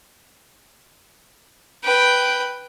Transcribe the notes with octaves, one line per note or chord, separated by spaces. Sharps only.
B4 G5